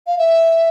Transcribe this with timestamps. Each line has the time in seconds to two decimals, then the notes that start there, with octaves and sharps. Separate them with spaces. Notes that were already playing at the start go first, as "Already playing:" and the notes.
0.07 F5
0.18 E5